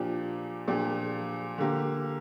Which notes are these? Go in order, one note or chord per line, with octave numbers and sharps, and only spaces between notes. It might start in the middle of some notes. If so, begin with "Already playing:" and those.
Already playing: A#2 F3 D4 G4
A#2 F3 D4 G4
D3 A#3 G4